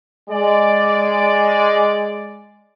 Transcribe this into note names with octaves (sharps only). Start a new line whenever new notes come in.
G#3 D5